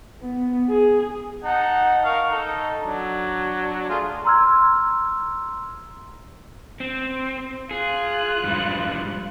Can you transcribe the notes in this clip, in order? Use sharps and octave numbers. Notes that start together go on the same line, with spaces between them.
B3
G#4
D#4 F#5 A5
A#4 F5 C#6
D#4 A4
F#3 D4
A3 F4 G#4
A#5 C6 E6 F6 G#6
C4
F4 G#4 F#6
F2 G#2 G3